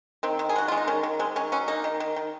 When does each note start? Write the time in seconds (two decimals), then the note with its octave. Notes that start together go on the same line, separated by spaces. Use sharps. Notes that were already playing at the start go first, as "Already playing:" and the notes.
0.23 D#3 C4
0.39 D#3
0.49 G#4
0.56 G#3 F#4
0.68 G#3 F4
0.77 D#4
0.88 D#3 C#4
1.03 D#3
1.19 G#3 C4
1.36 D#3 C#4
1.52 F#3 C#4
1.68 A#3 D#4
1.84 D#3
2.00 D#3
2.16 D#3